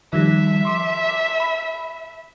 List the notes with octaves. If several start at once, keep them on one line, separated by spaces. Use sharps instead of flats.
D#3 F3 G3 E5
C6 D6
B5